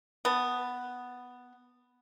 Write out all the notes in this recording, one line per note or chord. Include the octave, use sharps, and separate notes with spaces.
B3 A5